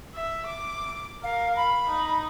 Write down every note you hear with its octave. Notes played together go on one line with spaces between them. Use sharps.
E5
D6
A#4 F5
B5
D#4